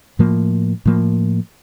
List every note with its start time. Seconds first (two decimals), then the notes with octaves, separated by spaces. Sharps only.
0.19 A2 F3 A#3
0.85 A2 F3 A#3